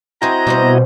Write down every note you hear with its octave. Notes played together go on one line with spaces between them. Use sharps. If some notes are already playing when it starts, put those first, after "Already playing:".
C4 E4 F#4 C5 D#5 G#5 A#5
B2 G3 C4 C5